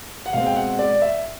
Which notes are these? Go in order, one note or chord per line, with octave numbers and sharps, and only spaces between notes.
F#5
B2 G#3 C4 F5
G5
F#5
D5
E5